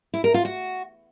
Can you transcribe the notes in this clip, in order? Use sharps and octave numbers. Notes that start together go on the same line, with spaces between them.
E4
A#4
F4
F#4